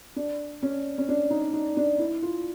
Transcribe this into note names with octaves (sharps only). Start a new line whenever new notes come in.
D4
C#4
C#4
D4
D#4
D#4
D4
E4
F4